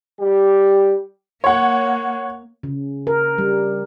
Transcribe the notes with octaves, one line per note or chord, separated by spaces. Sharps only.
G3 G4
A#3 C#5 F#5
C#3
A#4
G3